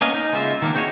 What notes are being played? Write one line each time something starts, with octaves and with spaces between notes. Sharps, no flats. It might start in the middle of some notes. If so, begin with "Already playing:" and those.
A#3 B3 C#4 D#5 F5
D#4
C#3 G#3 A#3 F4 E5
D#3 A#3 D4
C4 D#4 F#4 G#4 C#5